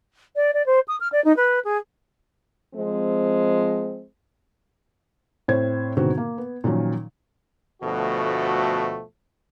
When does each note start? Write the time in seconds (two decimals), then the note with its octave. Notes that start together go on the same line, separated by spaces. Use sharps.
0.36 D5
0.53 D5
0.66 C5
0.88 D#6
1.00 F6
1.12 D5
1.24 D#4
1.36 B4
1.64 G#4
2.74 F3 G#3 C4
5.48 A2 C4 C5 C#5 G#6
5.97 G#2 B2 D3 D#3 C4 F#4
6.18 A#3
6.38 B3
6.64 A#2 D#3 F3 F#3 C#4
7.83 D2 B2 F3 A3 F#4 A4